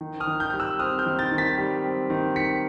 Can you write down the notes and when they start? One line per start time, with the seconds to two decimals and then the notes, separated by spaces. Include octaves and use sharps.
0.01 D#3
0.20 D#6 F6
0.27 D#3
0.40 F6 G6
0.50 G3 G6
0.60 E6 F#6
0.79 C4 D#6 F6
0.99 F6 G6
1.06 D#3
1.19 G6 A6
1.32 D#3
1.38 A6 B6
1.58 G3
1.84 C4
2.10 D#3
2.36 D#3 B6 C#7